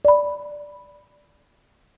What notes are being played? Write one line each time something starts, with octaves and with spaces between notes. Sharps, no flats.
D5 B5